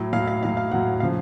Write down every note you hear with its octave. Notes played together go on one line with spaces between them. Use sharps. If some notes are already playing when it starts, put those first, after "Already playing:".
Already playing: A2 F#3
A2 F#3 F5
F5
A2 F#3 F5
F5
A2 F#3 F#5
C#3 F3 F5